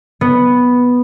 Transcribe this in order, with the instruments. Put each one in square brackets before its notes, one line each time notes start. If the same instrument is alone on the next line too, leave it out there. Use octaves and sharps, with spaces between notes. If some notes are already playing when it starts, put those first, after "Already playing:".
[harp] B3